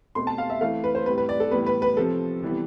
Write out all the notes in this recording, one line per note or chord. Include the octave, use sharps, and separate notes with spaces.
B2 A3 C4 C6
A5
F5
E5
E3 A3 C4 F5
B4
C5
A2 G3 C4 B4
B4
D5
A4
A2 E3 G3 B3 B4
B4
B4
C3 F3 C4 A4
C3 E3 G3 B3